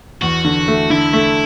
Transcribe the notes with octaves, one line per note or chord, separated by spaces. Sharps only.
E2 F#4
D3
A3
D3 E4
A3